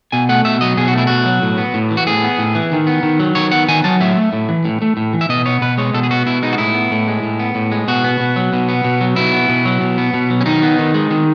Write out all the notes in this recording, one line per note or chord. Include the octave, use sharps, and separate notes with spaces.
B2 G#5
A3 F#5
B2 E5
F#3 D#5
B2 G#4
F#4
A3 E4
B2 F#4
F#3
A2
B3
A2
E3
F#4
A2 G#4
B3
A2
E3
D#3
B3
D#3
F#3
D#3 C#5
B3 F#5
D#3 G#5
F#3 A5
A2 E5
A3
A2
E3
A2
A3
A2
E3
E5
B2 D#5
B3 C#5
B2 B4
G#3 C#5
B2 A4
G#4
B3 F#4
B2 E4
G#3 D#4
F#4
A2 E4
B3
A2
G#3
A2
B3
A2
G#3
B2 F#4
B3
B2
F#3
B2
B3
B2
F#3
B2 E4
B3
B2
F#3
B2
B3
B2
F#3
C#4
D#3 D#4
B3
D#3
G#3
D#3